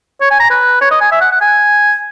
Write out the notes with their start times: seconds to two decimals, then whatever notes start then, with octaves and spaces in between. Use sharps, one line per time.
0.21 C#5
0.31 G#5
0.40 A#5
0.51 B4
0.81 C#5
0.91 D#5
1.01 G#5
1.12 E5
1.21 F#5
1.32 F#5
1.41 G#5